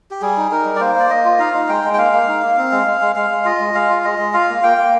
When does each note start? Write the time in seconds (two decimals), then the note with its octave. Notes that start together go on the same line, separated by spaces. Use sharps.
0.11 G4
0.21 G3 G#4
0.37 D#4
0.51 D#4 A#4
0.65 G3
0.76 D5
0.80 A#3 C5
0.95 A#3 D5
1.10 A#3 D#5
1.25 F4
1.39 D#4 F5
1.54 D#4
1.69 G#3 G5
1.84 G#3
1.94 G5
1.98 A#3 F5
2.13 A#3
2.28 D#4
2.43 A#3
2.57 C4
2.72 G#3
2.87 G#3
3.01 G#3
3.16 G#3 F5
3.30 G#3
3.45 F4 D#5
3.60 G#3
3.74 G#3 F5
3.89 F4
4.04 G#3 D#5
4.19 G#3
4.34 F4 F5
4.49 A#3
4.63 A#3 G5
4.78 A#3